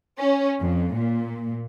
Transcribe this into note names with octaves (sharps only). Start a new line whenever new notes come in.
C#4
F2
A#2